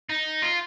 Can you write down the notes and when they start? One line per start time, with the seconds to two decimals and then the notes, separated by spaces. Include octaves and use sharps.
0.10 D#4
0.42 F4